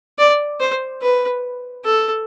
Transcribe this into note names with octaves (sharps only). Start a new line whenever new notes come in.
D5
C5
B4
A4